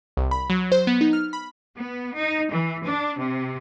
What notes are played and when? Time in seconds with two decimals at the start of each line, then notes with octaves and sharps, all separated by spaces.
0.17 C2
0.31 B5
0.50 F#3
0.72 C5
0.87 B3
1.01 D#4
1.13 F6
1.33 B5
1.77 B3
2.16 D#4
2.51 E3
2.85 D4
3.18 C3